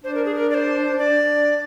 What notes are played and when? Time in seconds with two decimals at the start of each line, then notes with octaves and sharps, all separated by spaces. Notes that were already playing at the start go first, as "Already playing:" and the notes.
0.04 D4 C5
0.15 A#4
0.25 G#4
0.35 A#4
0.51 D5
0.54 C5
0.98 D4 D5